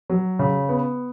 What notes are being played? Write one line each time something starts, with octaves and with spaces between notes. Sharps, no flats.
F#3
C#3
B3